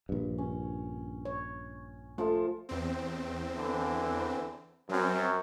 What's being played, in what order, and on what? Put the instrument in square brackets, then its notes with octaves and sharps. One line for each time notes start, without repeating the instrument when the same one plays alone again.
[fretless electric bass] A#1 G2
[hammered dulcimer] C#4
[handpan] C#5
[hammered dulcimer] F3 F4 A4 [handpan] A3
[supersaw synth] E2 C4
[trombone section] D3 E3
[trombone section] F#2 [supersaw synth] F#3 C4